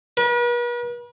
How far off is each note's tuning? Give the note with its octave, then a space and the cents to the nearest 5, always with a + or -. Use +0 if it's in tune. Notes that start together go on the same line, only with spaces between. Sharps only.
B4 -45